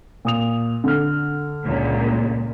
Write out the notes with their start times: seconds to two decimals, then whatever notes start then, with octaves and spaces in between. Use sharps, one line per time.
0.25 A#2 D#6 F7
0.84 D3 F6
1.65 C#2 A#2